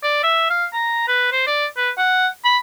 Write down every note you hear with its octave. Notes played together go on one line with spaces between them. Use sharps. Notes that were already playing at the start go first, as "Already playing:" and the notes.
D5
E5
F5
A#5
B4
C5
D5
B4
F#5
B5